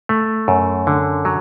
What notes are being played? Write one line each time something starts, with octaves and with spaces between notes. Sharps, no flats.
A3
F#2
D3
F#3